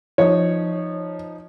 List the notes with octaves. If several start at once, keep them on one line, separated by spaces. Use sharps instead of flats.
F3 D#4 C#5